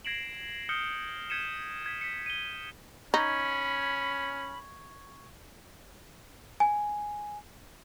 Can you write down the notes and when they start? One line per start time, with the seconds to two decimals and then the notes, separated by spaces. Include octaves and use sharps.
0.05 G#6 A#6 C7 D7 E7 F#7
0.69 D#6 F6 G6 C#7 G7
1.30 G6 G#6 B6 C#7 D#7 E7
1.86 G#6 B6
2.01 B6 C#7
2.26 D#7 G7
3.14 C#4 D#4 B5 C#6 G#6
6.60 G#5